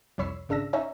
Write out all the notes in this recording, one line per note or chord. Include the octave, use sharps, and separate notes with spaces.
C2 F2 C#5 B5 E6 C7
G#1 C#3 D4 E6 A#6
C#4 D#4 C#5 E5 A#5